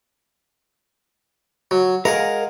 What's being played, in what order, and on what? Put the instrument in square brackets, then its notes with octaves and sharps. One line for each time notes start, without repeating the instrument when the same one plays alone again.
[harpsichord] F#3
[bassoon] G#3 [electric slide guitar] A#4 [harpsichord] F5 F#5 G#5